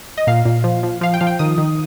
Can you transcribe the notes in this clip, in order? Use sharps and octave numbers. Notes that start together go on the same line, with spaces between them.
D#5
A#2 F5
A#2
F3
F3
F3 F5
G5
F3 F5
G5
D#3 D#6
D#3